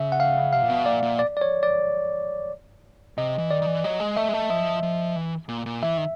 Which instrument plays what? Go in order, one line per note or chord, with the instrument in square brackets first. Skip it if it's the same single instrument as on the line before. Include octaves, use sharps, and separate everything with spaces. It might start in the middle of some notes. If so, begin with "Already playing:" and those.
Already playing: [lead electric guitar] C#3 [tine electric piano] E5
[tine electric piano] F#5
F5
[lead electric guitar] C3 [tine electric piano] F5
[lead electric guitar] A#2
B2
[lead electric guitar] A#2 [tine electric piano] D5
[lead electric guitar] A#2
[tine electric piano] D5
D5
C#5
D5
[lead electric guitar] C3 [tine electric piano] D#5
[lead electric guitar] E3
[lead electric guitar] D#3 [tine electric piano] D5
[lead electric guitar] D#3
E3
[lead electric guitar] F#3 [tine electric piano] D#5
[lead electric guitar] G#3
[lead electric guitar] A3 [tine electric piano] E5
[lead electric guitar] G#3
A3
[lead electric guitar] F3 [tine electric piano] E5
[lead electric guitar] F3
E3
A#2
A#2
[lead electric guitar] E3 [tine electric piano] E5
[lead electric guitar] D#3